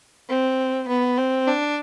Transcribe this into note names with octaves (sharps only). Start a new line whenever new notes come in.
C4
B3
C4
D4